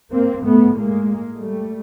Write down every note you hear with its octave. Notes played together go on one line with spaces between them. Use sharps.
A#3 C4
A2 A3 B3
G#3 A#3
G3 A3